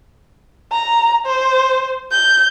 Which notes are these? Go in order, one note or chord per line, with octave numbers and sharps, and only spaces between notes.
A#5
C5
G6